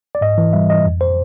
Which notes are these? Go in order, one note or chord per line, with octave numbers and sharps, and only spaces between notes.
D5
G#2 D#5
E3
G3 E5
E3 D#5
F2
C5